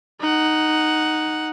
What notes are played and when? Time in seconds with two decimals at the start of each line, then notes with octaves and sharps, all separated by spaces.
0.21 D#4 F#5